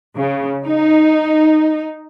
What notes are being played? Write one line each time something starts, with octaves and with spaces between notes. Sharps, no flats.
C#3
D#4